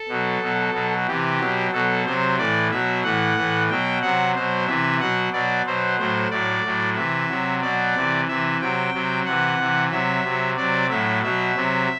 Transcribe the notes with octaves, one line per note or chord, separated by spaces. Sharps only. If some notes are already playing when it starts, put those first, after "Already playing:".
Already playing: A4
B2 F#3
B2 F#3
B2 F#3
C3 E3 G4
B2 F#3
B2 F#3 A4
C3 F#3 C5
A2 E3 D5
B2 F#3 E5
A2 E3 F#5
A2 E3
B2 F#3 G5
C3 F#3 F#5
B2 F#3 C5
C3 E3 E5
B2 F#3 F#5
B2 F#3 D5
B2 F#3 C5
A2 F#3 C5
A2 F#3 D5
A2 F#3
C3 E3 E5
C3 F#3
B2 F#3 D5
C3 E3
C3 E3 E5
C3 F#3 G5
C3 F#3
C3 E3 F#5
C3 E3
C3 F#3 E5
C3 F#3
C3 F#3 D5
A2 F#3 E5
B2 F#3 E5
C3 F#3